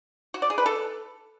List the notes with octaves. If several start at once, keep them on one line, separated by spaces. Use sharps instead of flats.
F#4
D5
G#4
B4
A4